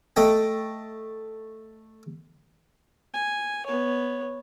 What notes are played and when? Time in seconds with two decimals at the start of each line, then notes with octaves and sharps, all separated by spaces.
0.16 A3 D#5 G5
3.14 G#5
3.66 B3 C#5